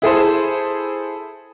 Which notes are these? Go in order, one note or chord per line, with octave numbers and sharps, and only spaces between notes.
E4 G#4 A4 C5